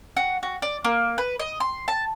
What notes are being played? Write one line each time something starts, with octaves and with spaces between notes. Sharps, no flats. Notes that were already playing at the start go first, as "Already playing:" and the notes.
F#4
F#4
D5
A#3
B4
D#5
C6
A5